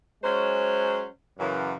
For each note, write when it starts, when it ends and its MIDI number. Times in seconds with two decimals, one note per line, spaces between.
0.23 1.06 54
0.23 1.06 56
0.23 1.06 61
0.23 1.06 72
1.39 1.74 42
1.39 1.74 49
1.39 1.74 52